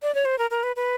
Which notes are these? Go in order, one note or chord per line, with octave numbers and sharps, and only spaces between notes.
D5
C#5
C5
A#4
A#4
B4
B4